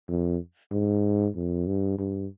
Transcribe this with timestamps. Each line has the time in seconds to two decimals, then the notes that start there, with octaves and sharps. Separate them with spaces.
0.09 F2
0.71 G#2
1.36 F2
1.67 G2
1.98 G2